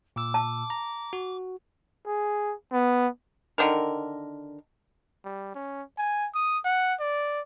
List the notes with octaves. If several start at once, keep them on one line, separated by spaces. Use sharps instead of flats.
A#2 D6 E6
A5
A#5
F#4
G#4
B3
D3 D#3 A#4
G3
C#4
G#5
D#6
F#5
D5